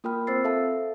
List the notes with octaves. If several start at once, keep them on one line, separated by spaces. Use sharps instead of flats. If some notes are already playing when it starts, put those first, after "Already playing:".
A#3 F4 A#4 G5 B5 F6
C4 C5 E6 A6 C7
A4 E5 F5 A5